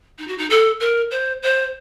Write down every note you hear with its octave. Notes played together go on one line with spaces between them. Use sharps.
D#4
F#4
D#4
A4
A#4
C5
C5